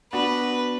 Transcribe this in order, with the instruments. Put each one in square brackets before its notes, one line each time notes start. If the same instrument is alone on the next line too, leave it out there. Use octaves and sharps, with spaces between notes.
[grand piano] B3 D4 F#4 [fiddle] B4